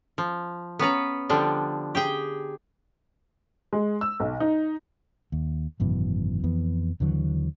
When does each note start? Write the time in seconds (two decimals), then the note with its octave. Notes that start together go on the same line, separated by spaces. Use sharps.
0.18 F3
0.79 B3 C#4 B4 A#5
1.29 D3 F3 G3 D4
1.95 G4 G#4 G5
3.73 G#3
4.01 E6
4.20 B1
4.40 D#4
5.32 D#2
5.80 G#1 F#2 B2 E3
6.43 F2 E3 B3
7.00 D#2 D3 E3 F#3